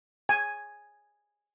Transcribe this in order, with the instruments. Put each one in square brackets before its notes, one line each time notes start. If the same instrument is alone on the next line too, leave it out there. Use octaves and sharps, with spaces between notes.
[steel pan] G#5